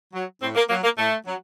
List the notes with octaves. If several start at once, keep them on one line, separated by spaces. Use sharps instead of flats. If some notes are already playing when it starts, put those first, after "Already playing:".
F#3
A2 C4
A#3
F#3 A#3
A#3
A2 A3
F#3